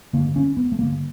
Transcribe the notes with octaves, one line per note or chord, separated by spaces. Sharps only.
G2 D3 A#3
C#4
B3
A3
G2 D3 A#3